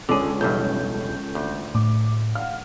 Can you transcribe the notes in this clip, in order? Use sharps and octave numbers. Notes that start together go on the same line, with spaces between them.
C#2 D3 C#4 G#4 A4 D6
B1 E2 G2 G6
D2
A2 D6
F5 F#5 F6